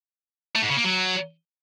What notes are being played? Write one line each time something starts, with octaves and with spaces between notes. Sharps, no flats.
A3
G#2
C#3
A#3
F#3